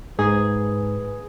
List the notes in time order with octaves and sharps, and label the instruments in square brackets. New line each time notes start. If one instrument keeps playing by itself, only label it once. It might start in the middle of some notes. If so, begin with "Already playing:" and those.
[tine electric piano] G#2 [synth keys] G#4 [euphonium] B4